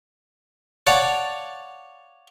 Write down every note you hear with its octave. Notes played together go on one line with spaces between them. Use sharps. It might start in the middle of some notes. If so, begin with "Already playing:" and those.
C#5 D5 F5 F#5 A5